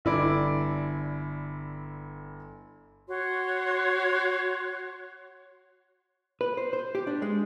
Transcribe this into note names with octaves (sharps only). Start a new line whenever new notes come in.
G1 E4 D5 D7
F#4 C#5 C6
B4
C5
C5
G4
D4
G#3